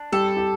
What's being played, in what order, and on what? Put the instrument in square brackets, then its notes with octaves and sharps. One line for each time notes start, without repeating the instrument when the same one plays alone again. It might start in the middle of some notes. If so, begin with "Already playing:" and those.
Already playing: [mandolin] D4
[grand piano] G3 G4 [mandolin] A4
[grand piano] G4